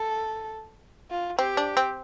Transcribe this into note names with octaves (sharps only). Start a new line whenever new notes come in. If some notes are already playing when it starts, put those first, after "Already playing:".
Already playing: A4
F4
C4 G4
D4
C4